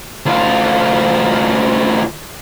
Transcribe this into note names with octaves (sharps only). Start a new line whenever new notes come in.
D2 F4